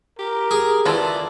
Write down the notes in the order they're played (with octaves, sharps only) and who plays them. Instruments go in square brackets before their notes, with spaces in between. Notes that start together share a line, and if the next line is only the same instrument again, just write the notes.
[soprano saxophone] G4 [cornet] A#4
[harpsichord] G#4
[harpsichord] E3 [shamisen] E4 F4 A4 [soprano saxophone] D5